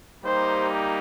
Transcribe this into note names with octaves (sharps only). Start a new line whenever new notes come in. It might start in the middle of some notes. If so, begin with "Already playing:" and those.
G3 A#3 D#4 G4 C5